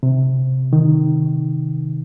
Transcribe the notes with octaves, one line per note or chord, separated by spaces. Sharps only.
C3
D#3